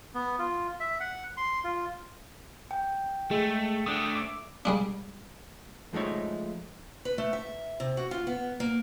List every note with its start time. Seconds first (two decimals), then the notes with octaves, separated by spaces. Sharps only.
0.15 B3
0.39 F4
0.80 E5
1.00 F#5
1.37 C6
1.64 F4
2.71 G5
3.31 G#3 A3
3.86 A3 D4 D#6
4.16 E5 D6
4.65 G3 G#3 D4
5.93 F3 G#3 A3 D#4 C#5
7.05 B4
7.18 A3
7.33 E5
7.80 C3
7.97 F#4
8.11 F4
8.27 B3
8.60 A#3